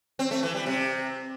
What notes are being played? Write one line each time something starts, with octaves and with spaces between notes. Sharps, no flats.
C4
A3
E3
G3
C3